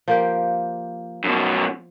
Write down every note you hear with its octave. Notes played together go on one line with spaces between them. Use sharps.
F3 A#3 G4
F#2 B2